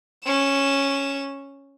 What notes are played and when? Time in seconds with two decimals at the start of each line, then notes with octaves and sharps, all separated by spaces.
0.25 C#4 E7